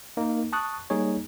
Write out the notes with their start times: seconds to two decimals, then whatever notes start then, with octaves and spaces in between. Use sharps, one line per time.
0.17 A#3 D#4 A#4
0.53 A5 C#6 D#6 F#6
0.90 G3 A#3 D#4 G#4 C#5